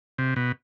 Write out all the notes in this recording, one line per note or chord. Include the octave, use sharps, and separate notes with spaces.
C3
B2